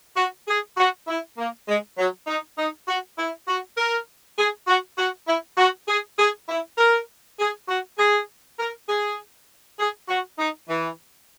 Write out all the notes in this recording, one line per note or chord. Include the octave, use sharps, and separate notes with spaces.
F#4
G#4
F#4
E4
A#3
G#3
F#3
D#4
D#4
F#4
E4
F#4
A#4
G#4
F#4
F#4
E4
F#4
G#4
G#4
E4
A#4
G#4
F#4
G#4
A#4
G#4
G#4
F#4
D#4
E3